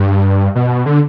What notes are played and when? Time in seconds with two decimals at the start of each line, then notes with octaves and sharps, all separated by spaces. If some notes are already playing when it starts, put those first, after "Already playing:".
Already playing: G2
0.55 B2
0.86 D3